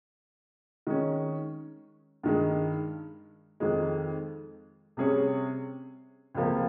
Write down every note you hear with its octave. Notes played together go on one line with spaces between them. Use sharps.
D#3 G#3 C#4
G2 D#3 G#3
F2 D#3 G#3
C3 G3 C#4 G#4 C#5
C#2 C3 F3 A#3